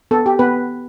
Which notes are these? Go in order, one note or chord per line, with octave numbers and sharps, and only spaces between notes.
B3 A4
G4
B3 B4